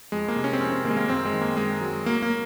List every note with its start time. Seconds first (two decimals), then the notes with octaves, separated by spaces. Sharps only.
0.12 F2 G#3
0.28 A#3
0.36 C3
0.44 C#4
0.53 C4
0.60 F2 C#4
0.72 C4
0.84 D#3 A#3
0.90 G#3
0.97 A#3
1.08 F#2 C4
1.26 G#3
1.33 D#3
1.41 A#3
1.57 F#2 G#3
1.81 F#3
2.05 F#3 A#3
2.22 A#3